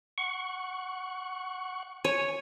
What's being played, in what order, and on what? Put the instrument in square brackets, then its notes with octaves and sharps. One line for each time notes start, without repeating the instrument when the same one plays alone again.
[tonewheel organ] F#5 C#6
[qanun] C#5 [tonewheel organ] G#5